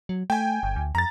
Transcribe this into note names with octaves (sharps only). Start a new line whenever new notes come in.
F#3
A3 G5 G#5
G1
D2
F2 A#5 A6